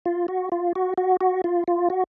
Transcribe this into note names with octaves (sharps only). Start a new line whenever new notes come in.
F4
F#4
F4
F#4
F#4
F#4
F4
F4
F#4